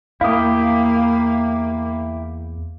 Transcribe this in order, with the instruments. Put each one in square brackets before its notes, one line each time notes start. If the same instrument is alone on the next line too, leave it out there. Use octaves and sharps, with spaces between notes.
[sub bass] E2 [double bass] A#3 [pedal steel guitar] E4 G4 [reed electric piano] F5 D#6